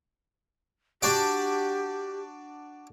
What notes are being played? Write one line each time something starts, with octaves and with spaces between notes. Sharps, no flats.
D4 F#4 G4 D5